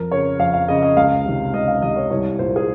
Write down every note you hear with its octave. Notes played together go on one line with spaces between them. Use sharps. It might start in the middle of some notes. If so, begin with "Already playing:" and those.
Already playing: F2 A#4
C#3 C#5
F2 F5
F5
C#3 D#5
D#5
C#2 F5
C3 D#3
C#2 D#5
F5
C3 D#3 D#5
C#5
C2 C#5
A#2 C5
G#4